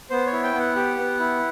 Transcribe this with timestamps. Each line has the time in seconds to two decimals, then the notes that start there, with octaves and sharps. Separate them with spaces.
0.10 B3 C5
0.27 C#5
0.32 E4
0.44 G5
0.54 B3
0.59 F#5
0.76 G4
0.99 B3
1.20 E4